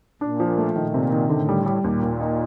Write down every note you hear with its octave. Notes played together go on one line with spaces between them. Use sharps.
A#2 D4
F3
A3
A#2 D#3
C3
D#3
A2 D3
G3
G3
D#2 A#2
D#2
D#4